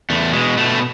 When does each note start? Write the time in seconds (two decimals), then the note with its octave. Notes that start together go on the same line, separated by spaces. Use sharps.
0.10 E2 A3
0.33 B2 G#3
0.57 B2 A3